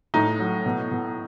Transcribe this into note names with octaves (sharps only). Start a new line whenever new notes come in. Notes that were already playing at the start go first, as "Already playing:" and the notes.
A2 D#4
F#3
B2
B2